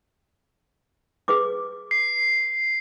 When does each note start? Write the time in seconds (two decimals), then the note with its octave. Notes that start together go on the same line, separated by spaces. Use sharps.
1.28 G#4 B4 D6
1.91 C7